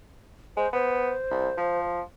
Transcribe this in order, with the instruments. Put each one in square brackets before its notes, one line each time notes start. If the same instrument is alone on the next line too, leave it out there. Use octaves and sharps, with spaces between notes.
[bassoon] G#3 [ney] C5
[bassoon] B3 [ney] C5
[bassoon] C2
F3